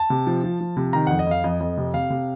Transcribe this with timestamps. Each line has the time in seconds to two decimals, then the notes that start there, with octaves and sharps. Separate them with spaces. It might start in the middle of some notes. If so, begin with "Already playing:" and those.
Already playing: A5
0.10 C3
0.27 F3
0.44 F3
0.60 F3
0.77 C3
0.93 D#3 A#5
1.07 F2 F#5
1.19 D#5
1.27 F2 F5
1.44 F2 D#5
1.60 F2
1.78 C3
1.94 C3 F5
2.10 C3